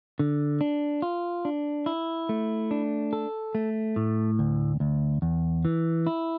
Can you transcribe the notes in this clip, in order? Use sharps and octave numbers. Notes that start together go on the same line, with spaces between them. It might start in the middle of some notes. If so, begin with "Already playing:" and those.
D3
D4
F4
D4
E4
A3
D4
A4
A3
A2
D2
D2
E2
E3
E4